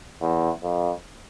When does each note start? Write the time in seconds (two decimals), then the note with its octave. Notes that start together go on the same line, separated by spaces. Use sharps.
0.21 E2
0.63 F2